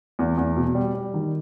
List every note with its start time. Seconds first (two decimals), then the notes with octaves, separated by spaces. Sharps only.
0.19 E2
0.37 E2
0.56 B2
0.75 G3
0.95 G3
1.14 D#3